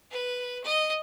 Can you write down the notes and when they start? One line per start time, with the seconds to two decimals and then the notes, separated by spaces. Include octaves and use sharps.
0.11 B4
0.64 D#5